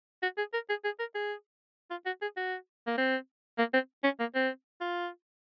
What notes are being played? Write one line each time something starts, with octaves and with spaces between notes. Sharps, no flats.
F#4
G#4
A#4
G#4
G#4
A#4
G#4
F4
F#4
G#4
F#4
A#3
C4
A#3
C4
C#4
A#3
C4
F4